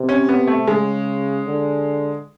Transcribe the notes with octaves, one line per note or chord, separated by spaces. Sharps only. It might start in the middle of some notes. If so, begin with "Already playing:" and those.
Already playing: C3
C#4
B3
A3
C#3 G#3
D3